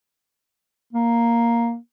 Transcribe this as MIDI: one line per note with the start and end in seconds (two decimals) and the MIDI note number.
0.93 1.76 58